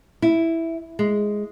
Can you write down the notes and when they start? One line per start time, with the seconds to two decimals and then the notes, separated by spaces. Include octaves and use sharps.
0.22 E4
0.99 G#3